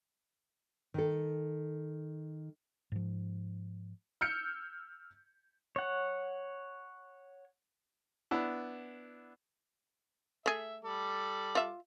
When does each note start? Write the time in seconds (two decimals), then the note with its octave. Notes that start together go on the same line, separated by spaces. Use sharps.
0.94 D#3 A4
2.92 G#2 F3
4.21 E6 F6 G6 C#7
5.76 C#5 F#5
8.31 B3 D4 E4
10.46 A3 G#4 E5
10.84 G3 A4 D6
11.55 F4 E5